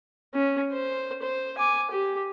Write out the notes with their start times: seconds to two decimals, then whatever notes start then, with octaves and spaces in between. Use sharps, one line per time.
0.34 C#4
0.72 C5
1.22 C5
1.58 G#5 D6
1.91 G4